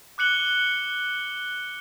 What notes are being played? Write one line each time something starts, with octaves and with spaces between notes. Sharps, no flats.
D6 F#6 C#7 F#7 G7